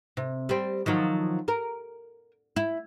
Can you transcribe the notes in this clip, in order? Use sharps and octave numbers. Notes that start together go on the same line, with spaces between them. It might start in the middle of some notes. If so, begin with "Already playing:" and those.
C3
G3 C4
D#3 F3 F#3
A#4
E4